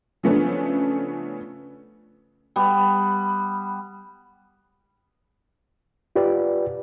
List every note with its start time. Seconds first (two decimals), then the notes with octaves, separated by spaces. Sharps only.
0.23 C#3 F3 A3 B3 C#4 D4
2.56 G3 B3
6.16 F4 G4 B4 D5